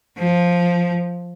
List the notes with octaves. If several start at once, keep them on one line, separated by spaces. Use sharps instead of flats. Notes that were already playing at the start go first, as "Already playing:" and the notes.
F3